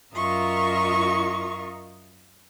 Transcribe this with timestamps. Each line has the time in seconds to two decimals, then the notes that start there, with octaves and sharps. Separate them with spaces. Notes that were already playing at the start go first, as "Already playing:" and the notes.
0.14 F#2 F4 A#4 D#5 E5 C#6